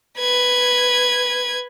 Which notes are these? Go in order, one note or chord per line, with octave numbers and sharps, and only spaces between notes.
B4 G#6